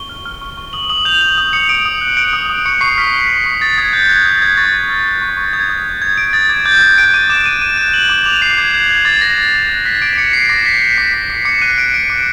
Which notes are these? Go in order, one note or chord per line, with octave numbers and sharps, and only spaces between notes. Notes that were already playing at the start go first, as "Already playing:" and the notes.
Already playing: C#6 G7
F6
F6
C#6
C#6
D#6 F#7
D#6 F#7
G6 F7
G6 F#7
D#6
D#6 C#7
D#6 D7
D#6
F#6
F#6 D7
D#6
D#6
C#6 C#7
C#6 C7
F6 B6
F6
C#6
C#6
D#6 A6
D#6 G#6
F#6 G6
F#6 G#6
D#6 A6
D#6 G#6
C#6 A6
C#6
F6
F6
C#6
C#6
D#6 G#6
D#6
G6
G6 G#6
D#6 D7
D#6 A6
D6 G#6
D6 G6
F#6 G#6
F#6 D7
D6 D#7
D6 E7
D6 D#7
D6 D#7
F#6 E7
F#6 F#7
D6
D6 F7
D6 C7
D6 G#6
F#6 G#6
F#6 G#6
D6 A6
D6 A#6
D6
D6
F#6
F#6 B6
D6 D7
D6 C#7
D6 C7
D6 A#6
G6 B6
G6 B6
D6 C7
D6 B6
D6 C7
D6 C#7
F#6 D#7
F#6 D7
D6 D7
D6 D7